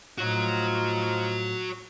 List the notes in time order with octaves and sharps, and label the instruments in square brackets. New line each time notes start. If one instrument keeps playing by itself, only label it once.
[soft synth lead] A2 [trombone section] F3 D#4 F4 [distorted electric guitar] F#4 C#5